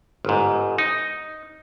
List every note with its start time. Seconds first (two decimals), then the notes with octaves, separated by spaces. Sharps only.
0.25 G1 G#2
0.78 D#4